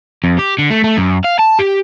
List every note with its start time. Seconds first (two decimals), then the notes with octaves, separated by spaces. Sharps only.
0.24 F2
0.39 G4
0.58 D3
0.71 A3
0.84 A3
0.97 F#2
1.25 F5
1.39 A5
1.59 G4